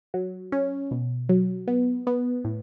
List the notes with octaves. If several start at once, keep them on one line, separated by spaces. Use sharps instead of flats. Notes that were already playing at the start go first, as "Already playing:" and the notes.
F#3
C#4
B2
F#3
B3
B3
A2